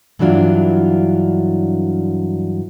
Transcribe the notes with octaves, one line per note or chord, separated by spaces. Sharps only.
G2 E3 F#3 D4 F4